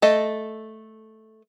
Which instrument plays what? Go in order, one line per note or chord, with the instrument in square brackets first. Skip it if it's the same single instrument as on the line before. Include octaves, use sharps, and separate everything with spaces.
[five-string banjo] A3 A4 D#5